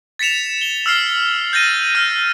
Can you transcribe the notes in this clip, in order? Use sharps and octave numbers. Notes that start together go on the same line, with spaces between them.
A6 B6 C#7 E7 F7
G7
E6 F6 C7
G6 A6 A#6 D#7
F6 G6